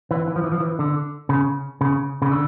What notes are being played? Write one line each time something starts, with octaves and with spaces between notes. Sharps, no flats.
E3
E3
F3
E3
F3
E3
D3
C#3
C#3
C#3
D3